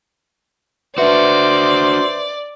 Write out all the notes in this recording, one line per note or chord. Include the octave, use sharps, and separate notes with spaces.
D4 F#4 B4 C5 D5 E5